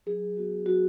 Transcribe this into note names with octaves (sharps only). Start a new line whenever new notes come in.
F#3 G#4
B3 F#4
F#3 F#4